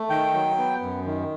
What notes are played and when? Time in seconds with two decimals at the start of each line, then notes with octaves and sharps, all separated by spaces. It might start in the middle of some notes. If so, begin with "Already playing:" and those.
Already playing: A3
0.10 D#3 G5
0.34 F#3
0.58 B3
0.82 F#2
1.06 D#3